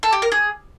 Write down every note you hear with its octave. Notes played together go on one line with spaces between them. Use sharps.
A4
G4
A#4
G#4